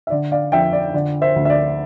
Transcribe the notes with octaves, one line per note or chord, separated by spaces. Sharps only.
E5
D3 D5
D5 F5
F2 E5 G5
D5
D3 D5
C5 E5
D2
E5
D5